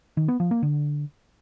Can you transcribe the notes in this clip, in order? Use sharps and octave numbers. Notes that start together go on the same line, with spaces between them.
D#3
B3
F3
A#3
D3